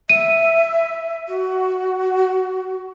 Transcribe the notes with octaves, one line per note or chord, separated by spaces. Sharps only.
E5 D#7
F#4